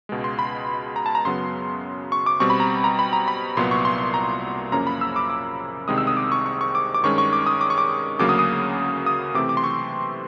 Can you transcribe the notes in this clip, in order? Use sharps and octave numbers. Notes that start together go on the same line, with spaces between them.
C#2 B2 G#3
C6
B5
A#5
A5
A#5
F#2 C#3 F#3 B3 C6
C#6
D6
B2 G3 C4 C#6
B5
A#5
A#5
B5
A#5
B5
C2 A#2 F#3 B3 C6
C#6
C6
A#5
F#2 C#3 F3 A#3 C#4 A#5
B5
E6
D6
D6
C2 C3 D#3 G#3 C4 D#6
E6
D#6
D6
C#6
C#6
C#6
D6
D6
G2 D#3 G#3 C#4 C#6
C#6
D6
D#6
D6
C#6
D6
D2 C#3 F#3 A#3 C#4 D6
D#6
D#6
D#6
C3 E3 A3 C4 D6
D6
C6
C#6